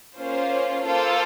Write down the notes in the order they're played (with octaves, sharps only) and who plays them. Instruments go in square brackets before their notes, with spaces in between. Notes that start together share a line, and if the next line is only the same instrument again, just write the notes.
[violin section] A#3 C#4 F4 C5
A#3 F4 A4 C5